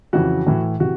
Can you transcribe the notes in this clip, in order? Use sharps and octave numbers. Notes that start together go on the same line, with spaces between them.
F2 C#3 E3 F#4
A2 E3
C3 E3 F#4